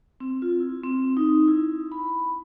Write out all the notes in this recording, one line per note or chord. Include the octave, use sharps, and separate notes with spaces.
C4
F4
E4
C4
D#4
E4
B5